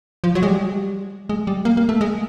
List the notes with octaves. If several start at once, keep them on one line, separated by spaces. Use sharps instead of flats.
F3
F#3
G#3
G3
G#3
G3
A#3
A#3
A3
G#3